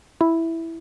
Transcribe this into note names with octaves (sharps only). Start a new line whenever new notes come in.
E4